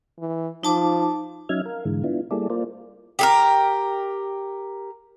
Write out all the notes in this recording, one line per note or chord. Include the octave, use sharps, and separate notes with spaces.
E3
F3 D#4 A5 D6
F#3 C#4 D#4 E5 F6 G#6
A#4 F5
G#2 D3 E3 G#3
B3 D4 E4 F4
G3 A#3 E4 G#4 A4 D5
A#3 F4 A#4 C5 D5
G4 G#4 A#4